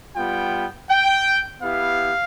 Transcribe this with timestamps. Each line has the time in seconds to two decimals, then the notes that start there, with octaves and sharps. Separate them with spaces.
0.15 G3 B3 F4 G5
0.89 G5
1.61 B3 E4 G4 F5